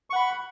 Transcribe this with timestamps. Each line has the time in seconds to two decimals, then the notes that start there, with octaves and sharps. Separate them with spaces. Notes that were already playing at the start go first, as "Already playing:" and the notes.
0.10 C#6
0.13 F#5
0.16 B5